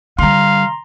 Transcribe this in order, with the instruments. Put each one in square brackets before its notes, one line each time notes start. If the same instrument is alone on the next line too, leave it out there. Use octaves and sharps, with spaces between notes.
[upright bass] D3 G3 [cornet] F5 [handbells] A#5 C6